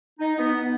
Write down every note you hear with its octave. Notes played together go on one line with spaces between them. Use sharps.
D#4
B3